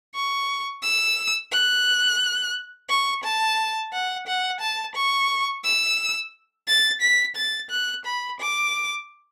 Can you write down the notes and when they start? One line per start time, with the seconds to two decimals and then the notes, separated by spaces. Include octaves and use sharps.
0.14 C#6
0.82 E6
1.52 F#6
2.89 C#6
3.24 A5
3.93 F#5
4.27 F#5
4.61 A5
4.95 C#6
5.64 E6
6.67 A6
7.01 B6
7.36 A6
7.70 F#6
8.05 B5
8.40 D6